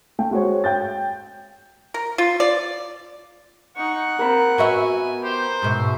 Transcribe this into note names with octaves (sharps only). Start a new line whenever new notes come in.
A3 G5
G#3 F#4 G#4 C5 C#5
G5 G6 A6
A#4
F4
D5
D#4 F#5 C#6
A#3 C4 A#4 A5 B5
B3 F#4 E5 G#5
G4 C5
G#2 B2 E5